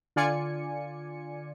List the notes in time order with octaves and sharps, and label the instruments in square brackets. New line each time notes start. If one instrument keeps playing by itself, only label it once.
[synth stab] D3 F4 D5 G#5 C#7